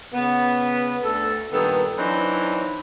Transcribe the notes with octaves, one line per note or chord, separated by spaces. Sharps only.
C#3 B3
D2 A4
G2 A#2 D#3 B3 A4
E3 F#3 C4 D4 D#4